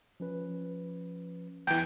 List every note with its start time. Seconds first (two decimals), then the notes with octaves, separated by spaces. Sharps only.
0.20 F3 C#4 B4
1.67 E2 E3 G5